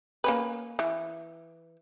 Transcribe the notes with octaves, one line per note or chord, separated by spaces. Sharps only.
A#3 C#4 B4
E3